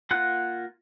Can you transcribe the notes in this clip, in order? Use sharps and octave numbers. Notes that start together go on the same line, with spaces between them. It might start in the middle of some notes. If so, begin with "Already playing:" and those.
A#3 F4 F#5 F#6